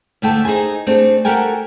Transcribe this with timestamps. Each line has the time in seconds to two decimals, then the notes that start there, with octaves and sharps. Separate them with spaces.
0.22 D2 A3 G5 A5
0.45 D#4 G#4 C5 G#5
0.87 A3 C4 D4 G#4
1.25 F#4 G4 A4 A#4 G5 G#5